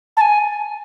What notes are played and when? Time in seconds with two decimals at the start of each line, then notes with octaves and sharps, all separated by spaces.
0.17 A5
0.21 G#5